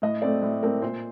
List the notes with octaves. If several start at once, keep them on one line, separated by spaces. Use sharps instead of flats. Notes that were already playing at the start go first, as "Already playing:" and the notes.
A2 D#5
A3 C4 D5
A2
A3 C4 A#4
A#2 C5